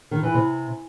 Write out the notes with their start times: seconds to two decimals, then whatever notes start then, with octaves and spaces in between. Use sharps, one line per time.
0.11 D#3
0.23 E3
0.34 C3